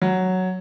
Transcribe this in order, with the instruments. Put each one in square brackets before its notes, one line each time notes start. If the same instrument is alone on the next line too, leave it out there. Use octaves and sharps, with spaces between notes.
[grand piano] F#3